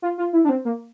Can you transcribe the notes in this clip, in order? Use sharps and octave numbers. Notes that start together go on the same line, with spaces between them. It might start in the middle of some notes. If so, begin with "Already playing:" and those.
F4
F4
E4
D4
C4
A#3